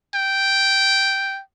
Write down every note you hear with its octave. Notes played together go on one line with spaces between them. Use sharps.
G5